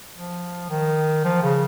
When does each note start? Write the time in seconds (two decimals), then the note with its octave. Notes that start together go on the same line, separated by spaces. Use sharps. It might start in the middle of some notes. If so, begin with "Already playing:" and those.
0.15 F3
0.69 D#3
1.24 F3
1.42 C#3